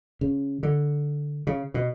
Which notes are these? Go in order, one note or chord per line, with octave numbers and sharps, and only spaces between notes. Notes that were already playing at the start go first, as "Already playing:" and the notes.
C#3
D3
C#3
B2